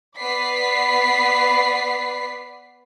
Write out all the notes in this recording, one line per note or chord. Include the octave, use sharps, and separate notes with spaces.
B3 B4 D5 B6 C7